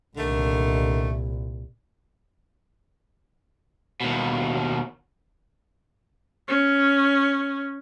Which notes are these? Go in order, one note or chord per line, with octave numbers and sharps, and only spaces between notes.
C2 A#2 D3 D#3 A3
D#2 B2
C#4